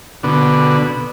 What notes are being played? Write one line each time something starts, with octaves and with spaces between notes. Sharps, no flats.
B2 D3